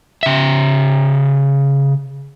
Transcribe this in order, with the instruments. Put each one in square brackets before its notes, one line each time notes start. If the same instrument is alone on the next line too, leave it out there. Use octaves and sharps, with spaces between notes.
[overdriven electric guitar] C#3 E5